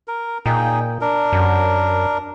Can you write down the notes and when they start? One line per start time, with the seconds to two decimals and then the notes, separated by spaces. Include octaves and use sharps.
0.08 A#4
0.46 A#2 D#4 G#4 G5
1.01 D4 A#4
1.33 F#2